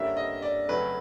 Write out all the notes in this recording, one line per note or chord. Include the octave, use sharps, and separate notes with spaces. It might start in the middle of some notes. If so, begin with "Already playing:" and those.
Already playing: G2 D3 G3 A#3 C#4 E5
D#5
D5
F2 C#3 F#3 A3 C#4 B4